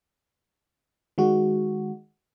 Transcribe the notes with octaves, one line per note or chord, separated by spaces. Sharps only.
D#3 G#3 F#4